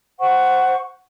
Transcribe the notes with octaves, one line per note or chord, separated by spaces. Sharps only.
C5 F#5 C#6